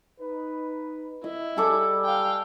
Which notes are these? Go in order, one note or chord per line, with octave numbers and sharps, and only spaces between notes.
D#4 B4
E4 D#5
G3 G#4 A4 D6
F5 G5